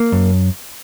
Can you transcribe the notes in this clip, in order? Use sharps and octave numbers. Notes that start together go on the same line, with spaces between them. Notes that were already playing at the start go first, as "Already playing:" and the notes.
Already playing: A#3
F#2